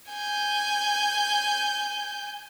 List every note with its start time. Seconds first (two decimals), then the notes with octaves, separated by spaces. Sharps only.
0.10 G#5 G6